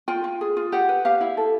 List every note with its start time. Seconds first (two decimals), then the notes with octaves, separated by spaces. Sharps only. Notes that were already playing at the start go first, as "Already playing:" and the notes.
0.08 F4 G5
0.24 F4
0.41 G#4
0.57 F4
0.72 G4 F#5
0.89 B4
1.05 G4 F5
1.21 E4
1.37 A4